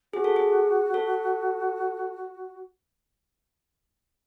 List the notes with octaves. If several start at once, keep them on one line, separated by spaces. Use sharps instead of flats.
F#4 G#4
A4
G#4
A4